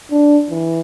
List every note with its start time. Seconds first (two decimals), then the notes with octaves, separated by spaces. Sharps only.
0.11 D4
0.50 E3